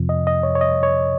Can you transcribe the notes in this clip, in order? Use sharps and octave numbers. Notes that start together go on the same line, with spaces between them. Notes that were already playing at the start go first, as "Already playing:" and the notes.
Already playing: F2 C3 F3
D#5
D#5
C#5
C#5
D#5
C#5